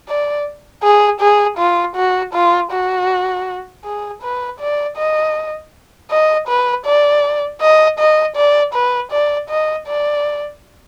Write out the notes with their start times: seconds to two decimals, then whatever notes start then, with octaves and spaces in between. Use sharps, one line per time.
0.08 D5
0.83 G#4
1.20 G#4
1.58 F4
1.96 F#4
2.34 F4
2.72 F#4
3.85 G#4
4.23 B4
4.60 D5
4.97 D#5
6.11 D#5
6.48 B4
6.86 D5
7.61 D#5
7.99 D#5
8.36 D5
8.74 B4
9.11 D5
9.49 D#5
9.88 D5